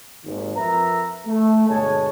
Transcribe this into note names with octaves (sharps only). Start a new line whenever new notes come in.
G#1 D#2
F2 A#4 B4 E5 A#5
A3
G1 B2 G#3 C#5 G#5 A5